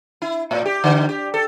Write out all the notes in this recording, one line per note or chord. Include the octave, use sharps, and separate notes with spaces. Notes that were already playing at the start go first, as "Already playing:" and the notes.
E4
A2
G4
D3
G4
A4